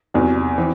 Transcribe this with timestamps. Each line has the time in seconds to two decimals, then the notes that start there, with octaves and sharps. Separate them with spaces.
0.14 E2 C3 F#3
0.57 E3 C4